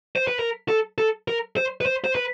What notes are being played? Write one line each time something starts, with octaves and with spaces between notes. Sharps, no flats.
C5
B4
A#4
A4
A4
A#4
C5
B4
C5
C5
B4